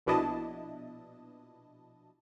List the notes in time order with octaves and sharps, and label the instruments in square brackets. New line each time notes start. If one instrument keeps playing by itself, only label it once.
[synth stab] A#1 B2 D4 E4 D#5 A5